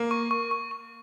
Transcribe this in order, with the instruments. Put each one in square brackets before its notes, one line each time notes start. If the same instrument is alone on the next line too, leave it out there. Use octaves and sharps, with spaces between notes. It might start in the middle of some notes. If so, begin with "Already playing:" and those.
Already playing: [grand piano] A#3
[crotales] C#6
C#6
C#6
C#6